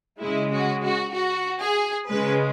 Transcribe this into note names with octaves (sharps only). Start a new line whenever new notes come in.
C#3 G#3 E4
F#4
F#4
F#4
G#4
C#3 G#3 B4